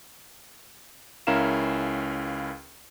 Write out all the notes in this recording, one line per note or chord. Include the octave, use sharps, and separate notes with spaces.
C#2 C#4 E4 A#4 F5 E7